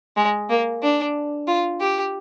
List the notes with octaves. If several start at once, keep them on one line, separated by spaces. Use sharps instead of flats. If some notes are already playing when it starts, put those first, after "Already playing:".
G#3
A#3
D4
F4
G4